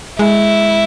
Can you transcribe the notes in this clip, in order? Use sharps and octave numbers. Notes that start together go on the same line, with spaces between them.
G#3 E4